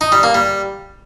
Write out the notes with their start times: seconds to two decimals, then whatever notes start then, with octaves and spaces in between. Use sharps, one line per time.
0.01 D#4
0.12 G3
0.23 A#3
0.34 G3